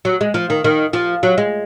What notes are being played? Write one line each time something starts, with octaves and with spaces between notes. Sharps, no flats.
F#3
G#3
F3
D#3
D#3
F3
F#3
G#3